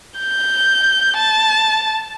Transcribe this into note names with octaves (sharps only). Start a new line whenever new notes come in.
G6
A5